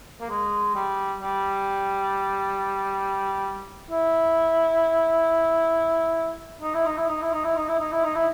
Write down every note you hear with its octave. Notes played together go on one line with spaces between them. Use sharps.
A#3
G#3
G3
G3
E4
D#4
E4
D#4
E4
D#4
E4
D#4
E4
D#4
E4
D#4
E4
D#4
E4